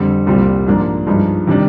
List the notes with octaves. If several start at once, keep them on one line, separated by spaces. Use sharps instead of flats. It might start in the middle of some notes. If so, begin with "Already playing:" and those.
Already playing: F2 D3 G3 C4
C2 A#2 G3 C4 F4
G#2 F3 A#3 D4 F4
G2 F3 G#3 D#4
C3 D#3 G3 D4